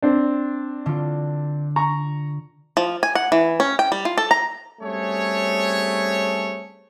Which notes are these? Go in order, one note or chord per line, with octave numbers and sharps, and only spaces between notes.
C4 D4
D3 F4
A#5 C#6
F3
G#5
F#5
E3
C#4
G5
G3
F4
A4
A#5
G3 A3 C4 C#4 G#4 C#5